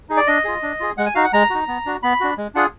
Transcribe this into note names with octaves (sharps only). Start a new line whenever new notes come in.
D#4 G#4
D5
D4 D#5
F4 G#4
D4
F4 G#4
G#3 F#5
G#5
D#4 F#4 F5
F#5
G#3 A#5
D#4 F#4
B3
D4 F#4
B3 B5
D4 F#4
G#3
D4 F4 G#4 F#5